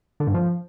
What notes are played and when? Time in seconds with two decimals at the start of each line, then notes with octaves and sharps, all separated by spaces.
0.20 D3
0.27 G2
0.34 F3